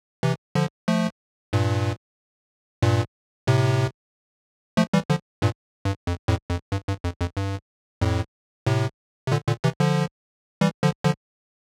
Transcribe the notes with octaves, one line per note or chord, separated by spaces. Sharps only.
C3 E3
D3 F3
F3 A3
G2 A#2
G2 A#2
A2 C3
F3 A3
E3 G3
D3 F3
G2 A#2
G2
F2
F2 A2
F2
G2
G2
F2
F2
G2
F2 A2
A2 C3
C3
A#2 D3
A#2 D3
C3 E3
D3 F3
E3 G3
D3 F3
D3 F3